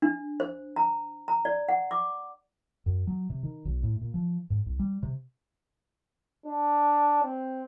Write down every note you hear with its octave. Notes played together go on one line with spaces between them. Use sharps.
D4
C5
A#5
A#5
D5
F#5
D6
F#2
F#3
C3
D#3
B1
A2
A#2
F3
G#2
C2
G3
C3
D4
C4